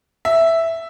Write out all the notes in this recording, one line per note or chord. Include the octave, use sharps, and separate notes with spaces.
E5